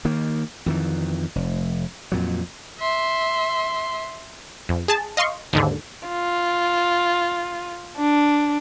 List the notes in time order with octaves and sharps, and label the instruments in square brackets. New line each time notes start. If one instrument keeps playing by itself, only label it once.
[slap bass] D#3 A#3
F2 D#3 E3
F1
F2 A#2 F#3
[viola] E5 C6
[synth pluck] F2
G#4 A5
D#5 F5 C6 C#6
D#2 G#2 D3
[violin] F4
D4